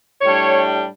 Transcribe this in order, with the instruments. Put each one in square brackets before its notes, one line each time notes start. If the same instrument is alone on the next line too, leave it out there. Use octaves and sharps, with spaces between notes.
[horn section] A2 G3 D4 C#5